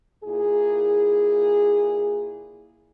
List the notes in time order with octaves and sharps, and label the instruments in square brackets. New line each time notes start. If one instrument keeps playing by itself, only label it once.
[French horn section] A#2 E4 G#4